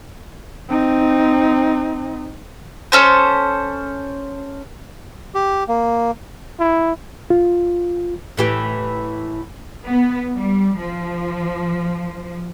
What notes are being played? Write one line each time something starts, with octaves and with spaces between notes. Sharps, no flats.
C4 D#4
C#4 A4 C5
G4
A#3
E4
F4
A2 E3 G4
B3
G3
F3